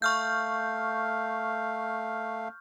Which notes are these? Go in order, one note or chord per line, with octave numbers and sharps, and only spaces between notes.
A3 F5 C#6 F6 G6